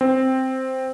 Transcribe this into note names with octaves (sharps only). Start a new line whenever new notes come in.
C4